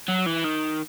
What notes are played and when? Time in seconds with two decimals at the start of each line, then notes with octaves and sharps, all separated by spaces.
0.09 F#3
0.26 E3
0.45 D#3